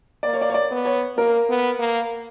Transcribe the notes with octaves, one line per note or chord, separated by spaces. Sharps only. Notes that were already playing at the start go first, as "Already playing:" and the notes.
A#3 D5
C#5
D5
C#5
D5
B3
C#5
A#3 A#4
B3
A#3